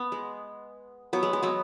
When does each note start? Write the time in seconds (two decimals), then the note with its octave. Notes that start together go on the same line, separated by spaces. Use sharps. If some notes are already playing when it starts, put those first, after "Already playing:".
Already playing: B3
0.12 G#3
1.13 F#3 B3
1.23 G#3
1.33 G#3
1.43 F#3 B3